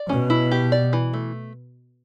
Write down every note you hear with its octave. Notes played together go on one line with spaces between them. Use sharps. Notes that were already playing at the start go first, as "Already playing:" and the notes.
Already playing: D5
B2 C#4
E4
G4
D5
E3
A3